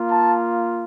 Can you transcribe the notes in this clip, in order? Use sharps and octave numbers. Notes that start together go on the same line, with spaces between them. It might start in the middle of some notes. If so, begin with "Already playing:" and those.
Already playing: A#3 F4
A5